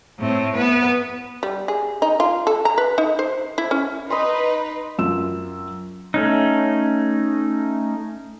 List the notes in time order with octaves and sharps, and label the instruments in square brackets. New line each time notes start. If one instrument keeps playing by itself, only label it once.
[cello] A2 C4
B3 B4
[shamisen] G3
G#4
D#4
F4
A4
A#5
B4
D#4
C5
E4
C#4
[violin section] D#4 B4 [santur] D#5 B5 C6
[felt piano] F#2 F4 E6 E7
[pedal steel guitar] A3 C#4 D#4